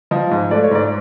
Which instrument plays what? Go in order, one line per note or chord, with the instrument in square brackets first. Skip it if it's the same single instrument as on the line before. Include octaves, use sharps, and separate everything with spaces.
[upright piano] F3 D#5
G#2
A3 D5
C#5
G#2 D5